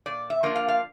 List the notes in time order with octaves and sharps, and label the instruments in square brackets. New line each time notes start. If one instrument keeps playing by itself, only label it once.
[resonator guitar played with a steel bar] A#2 D5
E5
F3 A#3 D4 F4
F5
F5